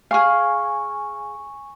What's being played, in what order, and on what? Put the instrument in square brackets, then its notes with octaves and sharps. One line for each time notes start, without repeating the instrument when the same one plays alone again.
[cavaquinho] G#4 F5 [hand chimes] G#5 C#6